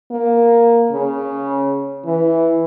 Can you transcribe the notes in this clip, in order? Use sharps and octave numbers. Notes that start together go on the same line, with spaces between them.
A#3
C#3
E3